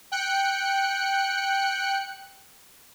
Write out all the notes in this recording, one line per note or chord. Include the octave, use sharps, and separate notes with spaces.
G5 F#6 C#7